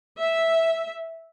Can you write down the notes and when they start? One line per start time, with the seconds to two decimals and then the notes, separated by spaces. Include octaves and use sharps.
0.19 E5